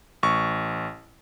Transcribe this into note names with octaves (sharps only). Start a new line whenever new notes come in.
A1 C#6